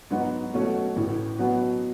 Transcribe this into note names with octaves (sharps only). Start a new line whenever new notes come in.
G#2 F#3 B3 D#4 F#4
B2 F#3 A3 C#4 F#4
A1 A2 E3
B2 F#3 B3